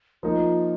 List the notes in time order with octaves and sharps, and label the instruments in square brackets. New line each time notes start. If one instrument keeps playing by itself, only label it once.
[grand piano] F3 A#3 D#4 A#4 [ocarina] F4